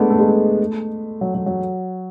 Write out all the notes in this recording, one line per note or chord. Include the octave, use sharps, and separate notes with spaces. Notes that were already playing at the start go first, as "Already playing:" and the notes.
Already playing: G#3 A3 B3 D4
A3
G#3
A3
F#3
F#3
F#3